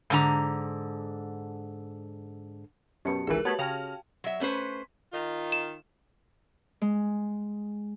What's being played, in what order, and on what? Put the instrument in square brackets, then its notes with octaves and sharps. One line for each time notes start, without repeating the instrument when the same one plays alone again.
[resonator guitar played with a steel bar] G#2 D3 A#5
[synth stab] F#2 B2 [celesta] G4 A5 C#7
[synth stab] G#1 C#2 E3 [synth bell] G#4 A#4
[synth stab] A3 B3 [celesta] F#4 G4 F#7 [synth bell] C#5 A5 G#6
[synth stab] C#3 F6 A#6 [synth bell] F5 G5 A5
[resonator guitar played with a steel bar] F#3 E5
A3 C#4 B4 C5
[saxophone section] D#3 D#4 F4
[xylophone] E7
[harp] G#3